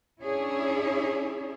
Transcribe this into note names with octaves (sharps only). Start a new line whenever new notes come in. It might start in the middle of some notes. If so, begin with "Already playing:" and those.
C#4 D4 E4 G#4 C#5